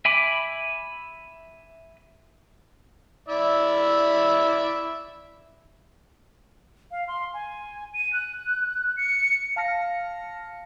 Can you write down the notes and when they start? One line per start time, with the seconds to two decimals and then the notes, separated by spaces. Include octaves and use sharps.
0.05 E5 G#5 B5 D6
3.29 E4 D5 E5
6.91 F5
7.08 C6
7.34 G#5
7.94 D#7
8.13 F#6
8.97 C#7
9.56 F5 A5 F6 A#6 C#7